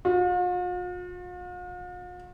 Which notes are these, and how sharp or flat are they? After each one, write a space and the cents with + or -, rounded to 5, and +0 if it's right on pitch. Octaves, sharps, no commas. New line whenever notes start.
F4 +45